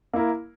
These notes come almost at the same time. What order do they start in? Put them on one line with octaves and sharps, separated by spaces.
A#3 E4 A#4